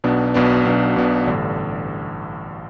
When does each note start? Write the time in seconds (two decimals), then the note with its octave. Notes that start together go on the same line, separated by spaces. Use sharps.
0.04 B1 B2 B3 D4
0.34 B1 B2 B3 D4
0.65 B1 B2 B3 D4
0.96 B1 B2 B3 D4
1.27 A1 G2 D3